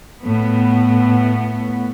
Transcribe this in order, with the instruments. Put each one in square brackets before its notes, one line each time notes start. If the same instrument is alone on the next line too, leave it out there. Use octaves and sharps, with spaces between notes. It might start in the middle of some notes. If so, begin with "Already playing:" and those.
[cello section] A2 B3